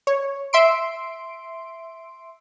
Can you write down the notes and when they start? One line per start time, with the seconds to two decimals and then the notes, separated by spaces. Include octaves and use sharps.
0.07 C#5
0.53 E5 C6 D7